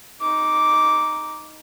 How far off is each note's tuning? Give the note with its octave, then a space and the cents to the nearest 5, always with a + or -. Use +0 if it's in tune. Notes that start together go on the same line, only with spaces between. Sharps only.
D#4 +0 D6 -5